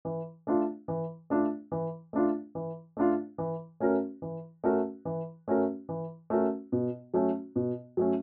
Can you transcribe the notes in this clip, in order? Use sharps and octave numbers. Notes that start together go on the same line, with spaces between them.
E3
A3 D4 F4
E3
A3 D4 F4
E3
A3 D4 F4
E3
A3 D4 F4
E3
A3 C#4 F#4 A#4
E3
A3 C#4 F#4 A#4
E3
A3 C#4 F#4 A#4
E3
A3 C#4 F#4 A#4
B2
F#3 A3 C#4
B2
F#3 A3 C#4